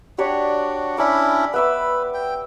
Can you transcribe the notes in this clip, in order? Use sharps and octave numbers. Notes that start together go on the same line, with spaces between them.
D4 F#4 G4 C#5 D5
C#4 D4 E4 B5 D6
B3 B4 E5 D6
G5